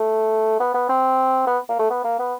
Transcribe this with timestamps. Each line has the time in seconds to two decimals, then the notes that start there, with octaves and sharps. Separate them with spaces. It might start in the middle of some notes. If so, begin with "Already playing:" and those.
Already playing: A3
0.60 B3
0.74 B3
0.89 C4
1.47 B3
1.69 A#3
1.79 A3
1.90 B3
2.04 A#3
2.19 B3